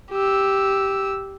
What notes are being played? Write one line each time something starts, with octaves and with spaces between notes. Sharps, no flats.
G4 E6